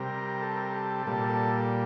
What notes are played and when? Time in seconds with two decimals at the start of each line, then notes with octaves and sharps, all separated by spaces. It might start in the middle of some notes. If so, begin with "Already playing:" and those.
Already playing: C3 G3 A#4
0.42 A4
0.55 A#4
0.69 A4
1.07 A#2 G3 A4
1.28 A4